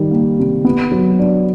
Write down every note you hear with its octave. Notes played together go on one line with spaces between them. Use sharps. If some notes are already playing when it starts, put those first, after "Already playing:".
Already playing: D#3 G3
A#3
C3
B3
F#3
D4